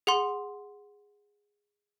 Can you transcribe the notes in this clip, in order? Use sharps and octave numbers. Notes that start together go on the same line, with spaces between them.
G#4 F#5 C6